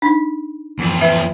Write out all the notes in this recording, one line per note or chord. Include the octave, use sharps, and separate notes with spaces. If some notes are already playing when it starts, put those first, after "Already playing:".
D4 D#4
E2 F3
B4 E5